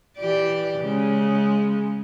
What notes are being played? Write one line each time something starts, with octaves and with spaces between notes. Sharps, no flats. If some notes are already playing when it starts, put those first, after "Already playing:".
E3 G4 D5
C#3 G#3